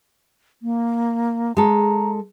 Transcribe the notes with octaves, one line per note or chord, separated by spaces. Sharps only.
A#3
G#3 A4 A#5